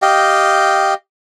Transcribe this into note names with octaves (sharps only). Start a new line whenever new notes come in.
G4 D#5 F5 G5